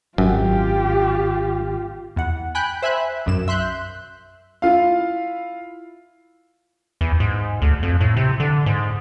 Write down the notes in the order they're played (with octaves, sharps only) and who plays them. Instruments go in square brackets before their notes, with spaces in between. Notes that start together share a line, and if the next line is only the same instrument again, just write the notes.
[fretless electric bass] G#1 [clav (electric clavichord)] F#2 [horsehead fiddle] F4 G4
[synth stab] E2 F#5
G5 G#5 B5 F#6 G6
C5 E5 G#5 B5 F#6
B1 F#2 E7
E5 C6 F#6 G6
[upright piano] E4 F4 F5
[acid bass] E2
G#2
D2
F2
A2
C3
D3
G#2